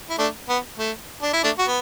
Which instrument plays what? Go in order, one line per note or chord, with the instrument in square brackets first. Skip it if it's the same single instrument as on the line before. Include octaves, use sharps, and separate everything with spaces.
[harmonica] E4
A3 D4
B3
A3
D4
E4
A3 D4
F#4
B3